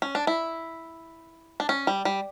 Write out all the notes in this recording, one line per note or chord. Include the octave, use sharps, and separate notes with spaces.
C#4
D4
E4
D4
C#4
G3
G3